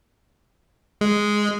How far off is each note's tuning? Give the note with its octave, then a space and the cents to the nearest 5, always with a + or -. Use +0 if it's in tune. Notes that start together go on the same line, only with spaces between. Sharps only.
G#3 +0